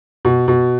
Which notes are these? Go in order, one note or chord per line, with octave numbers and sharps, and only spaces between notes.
B2
B2